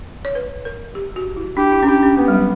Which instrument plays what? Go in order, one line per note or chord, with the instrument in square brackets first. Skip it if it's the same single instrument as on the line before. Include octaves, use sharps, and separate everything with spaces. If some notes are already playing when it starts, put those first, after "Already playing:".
[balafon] C#5
B4
A#4
G4
F#4
E4
[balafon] D4 [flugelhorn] G4
[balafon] E4
C#4
[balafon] D4 [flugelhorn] G4
[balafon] C#4
[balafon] A#3 [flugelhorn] B3
[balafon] G3
F#3